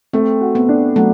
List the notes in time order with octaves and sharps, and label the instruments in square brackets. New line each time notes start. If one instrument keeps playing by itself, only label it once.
[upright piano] A3 [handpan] C4
[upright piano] F#4
[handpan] B3
[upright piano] D4
[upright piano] F#3 [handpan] A3